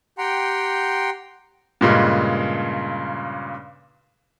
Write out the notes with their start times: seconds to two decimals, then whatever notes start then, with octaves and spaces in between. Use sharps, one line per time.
0.18 G4 F#5 G5 A#5 C6
1.81 G2 A#2 C#3 G#3